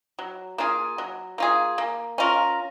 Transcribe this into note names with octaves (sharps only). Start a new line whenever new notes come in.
F#3
A#3 F4 G#4
F#3
A#3 F4 G#4
A#3
C#4 F4 A#4